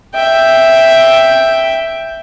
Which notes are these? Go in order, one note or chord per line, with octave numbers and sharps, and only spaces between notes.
E5 G5